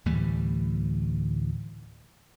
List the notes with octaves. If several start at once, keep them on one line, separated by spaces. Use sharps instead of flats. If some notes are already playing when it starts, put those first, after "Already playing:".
D2 A2 E3 G3